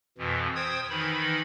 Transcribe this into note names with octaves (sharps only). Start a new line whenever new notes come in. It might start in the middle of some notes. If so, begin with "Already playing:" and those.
F2 B2 E3
C5 G5 D#6 G#6
D#3 E3 D#4 B5